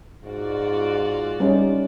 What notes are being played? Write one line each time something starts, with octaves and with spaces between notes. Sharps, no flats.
G#2 F4 F#4 D5
G3 C#4 D#4